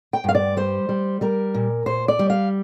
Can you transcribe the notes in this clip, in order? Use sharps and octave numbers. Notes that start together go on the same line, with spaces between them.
G5
G2 F5
D5
G3 C5
G3
G3 A#4
A#2
A#2 C5
D5
G3
F5